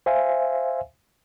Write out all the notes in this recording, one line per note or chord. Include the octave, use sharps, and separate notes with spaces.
C5 E5 F5 G#5